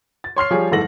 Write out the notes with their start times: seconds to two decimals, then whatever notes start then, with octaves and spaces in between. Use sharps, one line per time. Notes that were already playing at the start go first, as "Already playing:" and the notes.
0.24 A6
0.36 C#5 C6 F6 C7
0.51 F3 G3 G#4 C#5
0.71 F#1 G#2 E3 A4 A#6 F#7